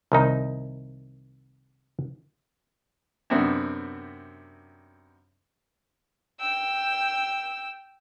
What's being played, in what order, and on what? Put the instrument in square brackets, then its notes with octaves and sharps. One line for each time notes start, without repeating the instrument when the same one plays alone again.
[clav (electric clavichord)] C2 D#3 D#4
[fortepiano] F#2 C3 B3 C4 D4
[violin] G5 E6